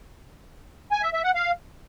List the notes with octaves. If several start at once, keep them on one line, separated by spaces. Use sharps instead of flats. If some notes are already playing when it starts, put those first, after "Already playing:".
G#5
E5
E5
F#5
F5